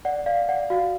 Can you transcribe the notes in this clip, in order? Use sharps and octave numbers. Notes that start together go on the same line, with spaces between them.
D5 F#5
D5 F5
D5 F#5
F#4 F5